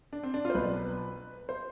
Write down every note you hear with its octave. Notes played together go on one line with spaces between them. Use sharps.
D4
C4
D4
F4
C5
B1 B2 B4
C5